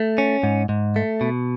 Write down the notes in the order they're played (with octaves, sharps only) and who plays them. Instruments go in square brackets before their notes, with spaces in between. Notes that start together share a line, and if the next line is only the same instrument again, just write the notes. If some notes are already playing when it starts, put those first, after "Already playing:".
Already playing: [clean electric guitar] A3
C#4
G#2
G#2
A3
B2